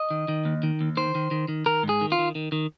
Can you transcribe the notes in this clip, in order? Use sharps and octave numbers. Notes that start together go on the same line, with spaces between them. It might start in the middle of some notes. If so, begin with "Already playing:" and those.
Already playing: D#5
D#3
D#3
D#2
D#3
D#2
D#3 C5
D#3
D#3
D#3
D#3 A#4
G#2
G#4
D#3
F4
D#3
D#3
D#3